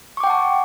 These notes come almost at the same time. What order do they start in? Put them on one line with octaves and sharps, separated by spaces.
C#6 D6 G5 F#5 A5